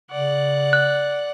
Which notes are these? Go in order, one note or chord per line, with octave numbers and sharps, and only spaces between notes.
C#3 D5 F#5
F#6